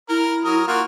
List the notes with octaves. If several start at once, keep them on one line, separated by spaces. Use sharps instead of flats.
E4 A#4
F#3 A#4 D#6
A#3 F4 F#4